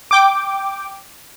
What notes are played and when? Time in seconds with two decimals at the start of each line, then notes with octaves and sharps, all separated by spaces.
0.11 G5 D6